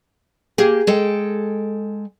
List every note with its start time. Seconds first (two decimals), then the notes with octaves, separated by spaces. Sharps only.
0.58 A#3 G4 G#4
0.87 G#3 A4 G5